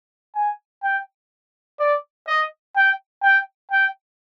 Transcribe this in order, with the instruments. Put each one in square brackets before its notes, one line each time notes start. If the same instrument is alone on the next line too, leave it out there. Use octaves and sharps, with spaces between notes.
[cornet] G#5
G5
D5
D#5
G5
G5
G5